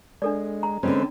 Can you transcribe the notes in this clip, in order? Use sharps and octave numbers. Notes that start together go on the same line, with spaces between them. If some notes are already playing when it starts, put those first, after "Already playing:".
G#3 D4 A4 D5
A#5
D3 G#3 C4 C#4 B4 C5